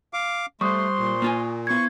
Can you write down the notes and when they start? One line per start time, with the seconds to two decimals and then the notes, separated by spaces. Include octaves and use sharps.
0.13 F5 D6
0.61 G3 A3 C5 C6 C#6 D#6 F#6
0.98 A#2
1.22 A#3 F4 G#5
1.67 B3 E4 C5 C#6 G#6